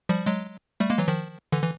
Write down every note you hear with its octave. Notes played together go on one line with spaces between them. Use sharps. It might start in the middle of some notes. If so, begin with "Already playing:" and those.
F3 G3
F#3 G#3
G3 A3
G#3 A#3
E3 F#3
D#3 F3
D3 E3
E3